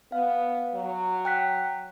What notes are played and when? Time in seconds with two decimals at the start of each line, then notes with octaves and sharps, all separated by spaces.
0.12 B3 F5
0.74 F#3
1.25 G5 F#6 B6